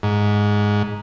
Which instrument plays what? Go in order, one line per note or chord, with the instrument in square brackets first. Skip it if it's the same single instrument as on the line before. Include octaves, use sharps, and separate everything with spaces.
[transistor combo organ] G#2